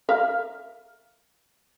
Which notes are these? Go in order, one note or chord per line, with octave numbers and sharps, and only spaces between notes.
A#4 E5 F5